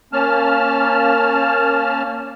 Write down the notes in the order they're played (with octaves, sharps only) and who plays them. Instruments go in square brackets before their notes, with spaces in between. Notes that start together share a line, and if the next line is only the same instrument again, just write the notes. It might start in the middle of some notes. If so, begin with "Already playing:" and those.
[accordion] A#3 C#4 A5 F6